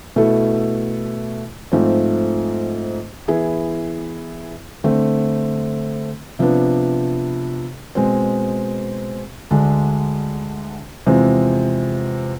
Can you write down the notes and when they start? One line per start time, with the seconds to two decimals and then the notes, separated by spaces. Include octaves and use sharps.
0.16 B2 A3 E4 A4
1.72 G#2 F3 A3 C4
3.28 E3 B3 E4 G#4
4.84 D3 A3 C4
6.39 C3 F3 B3 D4
7.95 B2 G#3 C4
9.51 D2 D3 G#3 D4
11.07 E2 C3 F3 G#3 C4